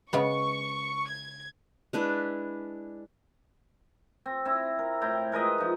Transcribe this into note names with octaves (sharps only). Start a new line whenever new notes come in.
C#3 G#3 B3 C#6
G#6
G#3 D4 E4 B4
C4
C4 E4
A#4
A2 E4 G5 A#5
G#3 A#4 B4 D#5
F3 D#4